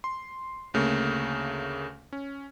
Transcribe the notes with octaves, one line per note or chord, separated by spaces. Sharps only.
C6
D2 C#3 A3 A#3
C#4